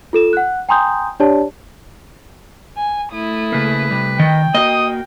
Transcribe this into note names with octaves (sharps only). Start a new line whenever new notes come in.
F4 A4 E7
F#5 F#6
G5 G#5 A#5 C6 D#6 G6
D4 G4 C#5 D5 A5
G#5
A3 E4 D#6
C#3 A#3 B4
C3 G3
D#3 D#5 G5
A#3 F#4 D#5 D#6